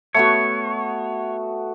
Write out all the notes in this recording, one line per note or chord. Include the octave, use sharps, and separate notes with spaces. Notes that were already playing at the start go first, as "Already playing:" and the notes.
A3 B3 F#4 C#5